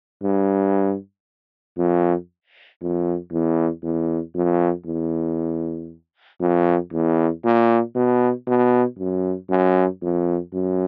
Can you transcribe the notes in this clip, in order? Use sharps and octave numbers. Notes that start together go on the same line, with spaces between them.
G2
F2
F2
E2
E2
F2
E2
F2
E2
A#2
B2
B2
F#2
F#2
F2
F#2